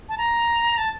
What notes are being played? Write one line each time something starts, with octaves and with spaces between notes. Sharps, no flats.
A5
A#5
A5